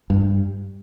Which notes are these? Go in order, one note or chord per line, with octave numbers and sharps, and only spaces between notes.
G2